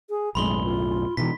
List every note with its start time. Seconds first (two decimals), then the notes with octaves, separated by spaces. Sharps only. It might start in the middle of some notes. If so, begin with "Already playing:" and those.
0.10 G#4
0.35 B1 F#2 A2 G#3 B5 C6 G7
0.64 F4
1.17 B2 D3 E3 D#4 B6